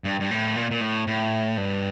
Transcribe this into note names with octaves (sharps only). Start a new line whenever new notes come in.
G2
G2
A2
A#2
A#2
A2
A2
G2